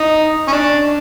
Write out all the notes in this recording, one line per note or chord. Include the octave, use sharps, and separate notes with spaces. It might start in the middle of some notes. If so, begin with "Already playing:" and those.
Already playing: D#4
C#4
D4